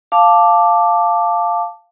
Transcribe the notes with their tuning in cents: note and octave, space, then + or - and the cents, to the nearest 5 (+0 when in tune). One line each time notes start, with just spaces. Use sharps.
F5 +0 A5 +0 D6 +0